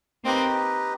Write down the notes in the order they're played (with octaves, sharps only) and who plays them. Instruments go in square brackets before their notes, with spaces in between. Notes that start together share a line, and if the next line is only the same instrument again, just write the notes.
[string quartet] A#3 C4 [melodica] D#4 G4 B4 D#5